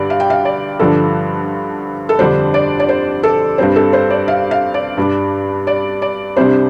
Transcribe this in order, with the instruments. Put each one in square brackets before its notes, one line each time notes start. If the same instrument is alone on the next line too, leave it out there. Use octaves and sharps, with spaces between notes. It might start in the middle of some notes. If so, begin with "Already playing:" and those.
Already playing: [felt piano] G2 D3 G3 D5
F5
G5
F5
D5
G2 D3 F3 D4 A4
A4
F2 D3 G3 D4 C5
D5
D5
C5
A4
G2 G3 C4 C5
A4
C5
D5
F5
F5
D5
G2 G3 D4
D5
D5
C2 C3 G3 D4 C5